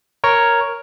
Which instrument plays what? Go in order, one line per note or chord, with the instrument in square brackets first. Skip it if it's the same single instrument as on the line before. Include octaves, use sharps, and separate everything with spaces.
[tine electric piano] A#4 C#5